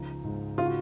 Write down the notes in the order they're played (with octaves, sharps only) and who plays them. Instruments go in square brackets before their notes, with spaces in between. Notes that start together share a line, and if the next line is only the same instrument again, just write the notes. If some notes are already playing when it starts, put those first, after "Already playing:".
Already playing: [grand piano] C#2 F3 D#4
G#2
C#3 F4
F#4